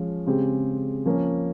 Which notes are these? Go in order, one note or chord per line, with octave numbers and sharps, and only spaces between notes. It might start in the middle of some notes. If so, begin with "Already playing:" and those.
Already playing: F3 G#3 C#4
C#3 G#3 C4 G4
F3 A#3 C#4